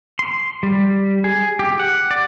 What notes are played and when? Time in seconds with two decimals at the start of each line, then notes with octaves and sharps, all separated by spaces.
0.19 C6
0.63 G3
1.24 G#4
1.59 G4
1.80 F#5
2.11 D5